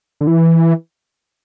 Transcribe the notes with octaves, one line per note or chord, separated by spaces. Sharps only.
D3
E3